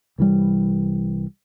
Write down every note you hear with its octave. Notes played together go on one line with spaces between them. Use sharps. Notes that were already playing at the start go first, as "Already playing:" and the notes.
C2 E3 G3